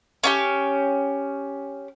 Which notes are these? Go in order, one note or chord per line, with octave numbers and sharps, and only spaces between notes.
C#4 F4 G4